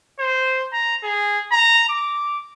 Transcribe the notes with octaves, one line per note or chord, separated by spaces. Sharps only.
C5
A#5
G#4
A#5
D6